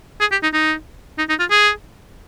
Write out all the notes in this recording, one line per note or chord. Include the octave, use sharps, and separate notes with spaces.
G#4
G4
D#4
D#4
D#4
D#4
F4
G#4